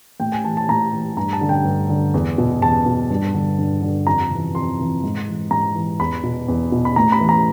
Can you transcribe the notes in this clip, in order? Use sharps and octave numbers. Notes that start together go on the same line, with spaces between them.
A2 G5
G#5
E3 A5
A5
A2 A#5
E3
G2 A#5
A5
D3
G5
G2
D3
E2
B2
E2 A5
B2
G2
D3
G2
D3
F2 A#5
C3 E3
F2 C6
C3 E3
G#2
E3
G#2 A#5
E3
E2 B5
B2
E2
B2
B5
A2 A#5
B5
E3
A#5